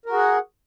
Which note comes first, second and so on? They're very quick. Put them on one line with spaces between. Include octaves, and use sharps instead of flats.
A#4 F#4 G#4 F#5